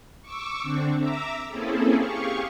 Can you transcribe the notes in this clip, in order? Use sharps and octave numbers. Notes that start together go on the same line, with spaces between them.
C#6 D6 E6
D3 C4 D4
E5 A#5 D6 E6
A#3 C4 C#4 E4 G#4 A4
G4 G#4 F5 C#6